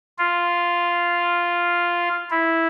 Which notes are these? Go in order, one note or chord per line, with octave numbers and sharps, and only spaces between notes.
F4
E4